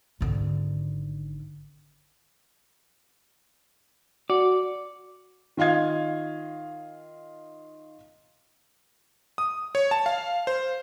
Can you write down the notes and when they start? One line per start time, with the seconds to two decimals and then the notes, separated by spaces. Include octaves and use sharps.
0.21 G#1 D3
4.30 F#4 D5
5.57 D#3 F4 D#5 F5 G#6
9.38 D#6
9.75 C#5
9.91 A5
10.06 F5
10.47 C5